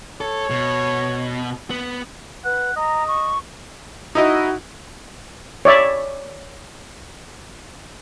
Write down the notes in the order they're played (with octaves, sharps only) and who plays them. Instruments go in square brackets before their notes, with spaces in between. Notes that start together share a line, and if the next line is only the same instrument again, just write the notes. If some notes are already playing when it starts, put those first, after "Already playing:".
[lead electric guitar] A4 [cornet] C#5
[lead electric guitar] B2
B3
[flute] B4 [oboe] F#5
[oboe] D#5 [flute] A#5
[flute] C#6
[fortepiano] D#4 E4 D#5 [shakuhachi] F#4
[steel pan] C#5 D5 E5